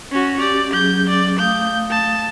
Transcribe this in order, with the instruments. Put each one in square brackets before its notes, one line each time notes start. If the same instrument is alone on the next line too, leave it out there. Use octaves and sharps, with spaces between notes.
[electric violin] C#4 F#4
[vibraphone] C#4 G4 [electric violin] D5
[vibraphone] F#3 C#4 G#4 [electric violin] G6
[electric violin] D5
[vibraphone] A3 F5 D#6 [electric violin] G6
[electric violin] A5